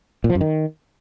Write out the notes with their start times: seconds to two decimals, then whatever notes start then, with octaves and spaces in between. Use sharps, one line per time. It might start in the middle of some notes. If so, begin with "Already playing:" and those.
0.24 A#2
0.30 F3
0.35 F#2
0.41 D#3